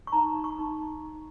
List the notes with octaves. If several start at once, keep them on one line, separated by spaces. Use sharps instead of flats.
C#6
D#4 A#5
C#6
D#4